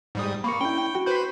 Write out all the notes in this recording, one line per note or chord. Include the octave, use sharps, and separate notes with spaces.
G#2 G3 D#6
A#3 B5 C#6 C#7
C#4 D4 E4 G5 G7
F#4
B4 C5 B5 G6